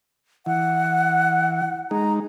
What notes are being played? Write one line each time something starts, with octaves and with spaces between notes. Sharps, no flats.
E3 F#5
G#3 D#4 A#5